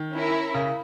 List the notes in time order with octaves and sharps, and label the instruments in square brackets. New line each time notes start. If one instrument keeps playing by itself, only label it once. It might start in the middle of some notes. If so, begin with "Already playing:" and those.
Already playing: [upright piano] D#3
[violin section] C#4 E4 A#4
[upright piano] C#3